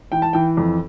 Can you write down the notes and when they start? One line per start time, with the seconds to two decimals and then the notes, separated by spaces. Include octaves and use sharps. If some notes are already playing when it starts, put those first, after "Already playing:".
0.12 E3 G5
0.22 A5
0.33 E3 G5
0.57 F2